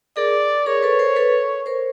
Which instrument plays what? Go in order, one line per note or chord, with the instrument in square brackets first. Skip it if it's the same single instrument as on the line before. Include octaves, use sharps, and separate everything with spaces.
[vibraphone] G#4 A#4 [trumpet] D5
[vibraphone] G#4 A#4 [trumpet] C#5
[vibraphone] A4 B4
A#4 C5
A4 B4
A#4 C5